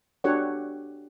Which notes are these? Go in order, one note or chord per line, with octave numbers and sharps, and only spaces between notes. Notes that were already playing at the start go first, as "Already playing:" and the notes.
D4 F#4 G4 A4 C#5 F#5